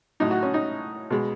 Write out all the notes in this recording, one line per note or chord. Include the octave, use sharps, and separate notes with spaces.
A2 F#3 D#4
F#4
C#4
D#4
B2 G#3